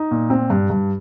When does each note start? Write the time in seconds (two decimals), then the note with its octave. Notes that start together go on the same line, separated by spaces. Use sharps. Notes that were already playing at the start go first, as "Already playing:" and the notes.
Already playing: D#4
0.11 A#2
0.30 C4
0.50 G2
0.70 G2